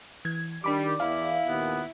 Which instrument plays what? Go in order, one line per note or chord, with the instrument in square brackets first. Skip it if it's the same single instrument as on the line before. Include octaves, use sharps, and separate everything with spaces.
[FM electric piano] E3 G#6
[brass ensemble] D#3 G3 [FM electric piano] D4 B5 D6 [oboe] D5
[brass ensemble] E2 [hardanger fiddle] E4 [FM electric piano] F5
[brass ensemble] D#2 A#2 [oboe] B3